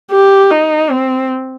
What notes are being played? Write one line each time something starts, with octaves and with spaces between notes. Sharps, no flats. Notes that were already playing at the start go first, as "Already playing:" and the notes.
G4
D#4
C4